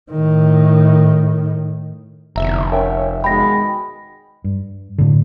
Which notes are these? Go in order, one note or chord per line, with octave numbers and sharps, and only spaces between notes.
A2 D#3
F1 E2 D3 E5 A#5
C#4 A#4 C#5 E5 G5
B2 D#3 G#3 G5 B5 A#6
G2
A2 D3